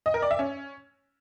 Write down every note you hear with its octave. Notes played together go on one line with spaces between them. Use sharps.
D#5
A#4
D5
E5
C#4